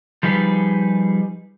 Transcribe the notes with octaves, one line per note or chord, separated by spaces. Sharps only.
F3 G3 D#4 G#4 B4